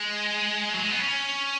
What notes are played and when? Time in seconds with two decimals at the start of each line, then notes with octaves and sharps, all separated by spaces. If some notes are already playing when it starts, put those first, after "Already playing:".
Already playing: G#3
0.73 F#3
0.82 G#3
0.91 B3
1.00 C#4